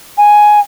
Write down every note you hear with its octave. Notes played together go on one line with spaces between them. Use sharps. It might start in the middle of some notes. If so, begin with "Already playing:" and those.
G#5